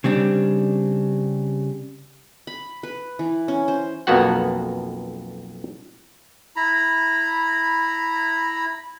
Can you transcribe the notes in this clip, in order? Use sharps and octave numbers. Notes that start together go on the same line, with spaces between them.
C#3 G3 C4 D4
B5
B4
E3
C#4
C5
B1 F2 A#3 B3 F#4 F#5
E4 A#5 B5